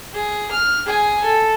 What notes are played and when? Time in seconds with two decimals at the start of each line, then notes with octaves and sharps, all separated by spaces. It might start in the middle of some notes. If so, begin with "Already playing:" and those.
0.14 G#4
0.52 F6
0.86 G#4 G#5
1.25 A4